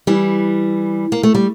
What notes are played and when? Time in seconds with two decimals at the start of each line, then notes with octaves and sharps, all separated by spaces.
0.07 E3 G3
1.12 A#3
1.23 A3
1.35 G3